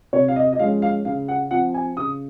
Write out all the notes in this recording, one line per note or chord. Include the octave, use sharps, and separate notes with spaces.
C3 C#5
F5
D#5
D#5
F3 G#3 C#4 F5
F5
C#3 F5
F#5
F3 C4 F#5
G#5
C#3 D#6